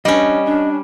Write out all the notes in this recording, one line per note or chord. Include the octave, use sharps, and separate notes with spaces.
G3 C#4 D4 D#5
D4